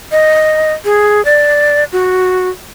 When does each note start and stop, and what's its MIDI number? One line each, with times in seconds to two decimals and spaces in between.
0.12 0.73 75
0.85 1.24 68
1.25 1.84 74
1.92 2.49 66